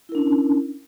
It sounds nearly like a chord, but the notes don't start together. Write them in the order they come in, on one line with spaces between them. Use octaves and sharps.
E4 A#4 D4 C#4